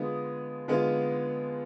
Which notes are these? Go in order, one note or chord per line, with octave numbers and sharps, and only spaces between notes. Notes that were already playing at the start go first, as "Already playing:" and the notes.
Already playing: D3 G#3 B3 F4 D#6
D3 G#3 B3 F4